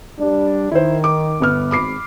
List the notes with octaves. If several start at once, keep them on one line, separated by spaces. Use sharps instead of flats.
G3 D4
D#3 E4 C5
D6
G1 B3 F6
G#1 B5 D6 C7